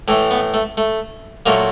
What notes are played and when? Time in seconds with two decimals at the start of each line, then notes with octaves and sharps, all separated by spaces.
0.08 A2 E3 A3
0.31 B3
0.54 A3
0.77 A3
1.46 A#2 F#3 A3 A#3